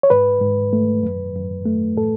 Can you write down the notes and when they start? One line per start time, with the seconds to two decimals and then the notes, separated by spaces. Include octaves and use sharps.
0.03 C#5
0.10 G#2 B4
0.41 G#2
0.73 A3
1.03 F#2
1.35 F#2
1.65 A3
1.97 A2 A4